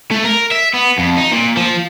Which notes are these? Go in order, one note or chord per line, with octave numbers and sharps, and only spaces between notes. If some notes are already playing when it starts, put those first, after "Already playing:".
A3
A#4
E5
B3
F2
D#4
A#2
F3